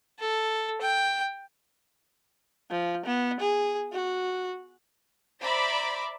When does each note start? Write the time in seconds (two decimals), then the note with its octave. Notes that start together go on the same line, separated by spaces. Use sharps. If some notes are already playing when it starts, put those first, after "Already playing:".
0.19 A4
0.81 G5
2.71 F3
3.06 B3
3.40 G#4
3.93 F#4
5.41 C5 D5 E5 A#5 B5 D6